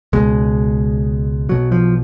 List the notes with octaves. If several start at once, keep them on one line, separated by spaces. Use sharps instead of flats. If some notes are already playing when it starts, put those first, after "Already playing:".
C#2 B2 G#3
B1 B2 F#3
F3